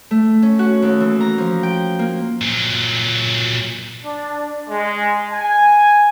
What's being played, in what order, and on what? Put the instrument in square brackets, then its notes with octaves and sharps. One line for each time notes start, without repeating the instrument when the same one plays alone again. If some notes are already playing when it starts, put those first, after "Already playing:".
[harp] A3
C#4
F#4
D#2
E3
A#5
F3
G5
A#3
[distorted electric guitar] A#2 F#3
[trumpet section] D4
G#3
G#5